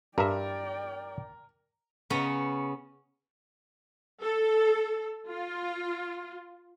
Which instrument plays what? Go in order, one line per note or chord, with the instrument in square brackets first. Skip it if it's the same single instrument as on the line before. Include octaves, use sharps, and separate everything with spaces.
[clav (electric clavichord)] G2 E5 [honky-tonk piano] A#4 [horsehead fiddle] D5 G5
[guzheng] C#3 B3 C#4 A#5
[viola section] A4
F4